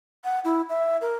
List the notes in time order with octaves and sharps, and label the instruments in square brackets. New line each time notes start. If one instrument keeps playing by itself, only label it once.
[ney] F#5
E4
E5
A#4